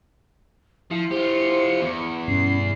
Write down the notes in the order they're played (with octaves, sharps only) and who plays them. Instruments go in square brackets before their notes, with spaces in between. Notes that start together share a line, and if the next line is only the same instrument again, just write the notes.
[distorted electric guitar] F3 [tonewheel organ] E4 C6 [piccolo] C#7
[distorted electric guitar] F4 G4 [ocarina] C5
[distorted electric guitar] E2
[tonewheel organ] G2 B2 [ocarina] C#4 [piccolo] C7